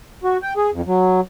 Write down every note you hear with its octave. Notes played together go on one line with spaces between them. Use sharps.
F#4
G5
G#4
F2
F#3